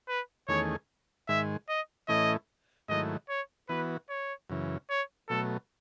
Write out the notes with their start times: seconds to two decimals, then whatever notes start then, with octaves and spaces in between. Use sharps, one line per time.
0.08 B4
0.48 E2 D#3 A3 C#4 G#4 C#5
1.28 G#2 D#3 G#3 E5
1.69 D#5
2.08 A2 E3 A3 C#4 E4 D#5
2.89 G#2 D#3 F#3 A3 E4 D#5
3.29 C#5
3.69 E3 B3 F#4 B4
4.09 C#5
4.50 F#2 C#3 E3
4.90 C#5
5.29 B2 F#3 A3 A4